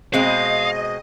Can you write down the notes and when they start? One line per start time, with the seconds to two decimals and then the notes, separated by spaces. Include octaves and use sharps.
0.14 B2 G#3 C4 D#5 F5